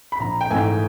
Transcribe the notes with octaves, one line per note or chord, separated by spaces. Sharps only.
B5
A#1 A#5
G5
G#2 E3 A3 G#5